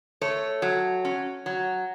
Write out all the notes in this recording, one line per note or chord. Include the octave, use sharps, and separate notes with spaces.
A3 C#5
F#3
C#4
F#3